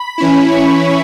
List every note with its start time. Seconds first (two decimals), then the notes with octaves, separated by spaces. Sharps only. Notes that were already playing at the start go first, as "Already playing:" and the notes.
Already playing: B5
0.18 E3 C#4 E4
0.51 C#6